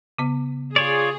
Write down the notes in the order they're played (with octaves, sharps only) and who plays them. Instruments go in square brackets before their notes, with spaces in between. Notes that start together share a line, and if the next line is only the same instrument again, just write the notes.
[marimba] C#3 B3
[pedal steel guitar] F4 C#5 D5 [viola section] G#4